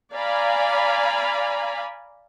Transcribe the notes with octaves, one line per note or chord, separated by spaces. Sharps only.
D5 F5 G#5 A#5 B5